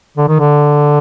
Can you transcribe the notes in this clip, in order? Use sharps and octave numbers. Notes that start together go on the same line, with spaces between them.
D3
D#3
D3